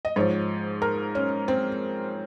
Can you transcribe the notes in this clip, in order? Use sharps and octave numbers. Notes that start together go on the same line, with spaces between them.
D#5
G#2 F3 C#5
A#4
C#4
C4